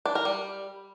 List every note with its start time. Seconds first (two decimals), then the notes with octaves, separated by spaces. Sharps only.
0.06 D4
0.15 A#4
0.25 G3